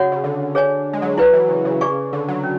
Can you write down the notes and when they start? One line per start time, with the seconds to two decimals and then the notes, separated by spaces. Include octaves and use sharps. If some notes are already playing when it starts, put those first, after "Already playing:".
Already playing: C#3 F#4 C#5 F#5
0.12 C#3
0.24 D3
0.55 G#4 C#5 G#5
0.93 G#3
1.02 F#3
1.18 F#3 E4 B4 D5
1.33 E3
1.49 C#3
1.65 C#3
1.81 C#3 G#4 D5 G#5 C#6
2.13 D3
2.29 F#3
2.44 C#4